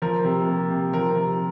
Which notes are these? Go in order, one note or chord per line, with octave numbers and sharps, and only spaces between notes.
F3 A#4
C3
A#3
C3
F3 A#4
C3